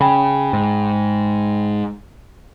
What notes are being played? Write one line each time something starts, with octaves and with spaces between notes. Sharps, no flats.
C#3 G5 B5
G#2